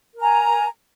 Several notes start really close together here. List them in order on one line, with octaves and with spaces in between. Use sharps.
A#4 A#5 G#5